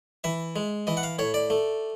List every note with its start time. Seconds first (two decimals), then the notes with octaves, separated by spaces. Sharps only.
0.24 E3 E5
0.56 G#3
0.87 E3 D#5
0.97 F#5
1.03 F5
1.19 A2 C#5
1.34 D5
1.50 A3